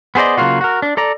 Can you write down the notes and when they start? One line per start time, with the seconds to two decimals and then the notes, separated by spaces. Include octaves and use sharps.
0.15 B3 G#4 C5 D5 D#5
0.37 C#3 F#3 A#3 F4 F#4
0.61 F#4 A#4
0.82 D4
0.97 A4 D5 A#5